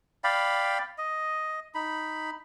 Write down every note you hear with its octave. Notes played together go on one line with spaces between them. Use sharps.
D5 F5 G5 B5
D#5
D#4 B5